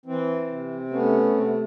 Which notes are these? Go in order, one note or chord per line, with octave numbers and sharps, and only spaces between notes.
E3 C4
C3
A3 B3 C#4
C3 C4
B3